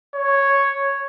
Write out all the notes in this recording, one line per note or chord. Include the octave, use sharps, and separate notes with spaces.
C#5